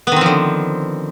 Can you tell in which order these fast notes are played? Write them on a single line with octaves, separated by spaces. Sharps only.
B3 D#3 C4 F3 D3